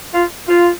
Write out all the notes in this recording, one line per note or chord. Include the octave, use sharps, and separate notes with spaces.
F4
F4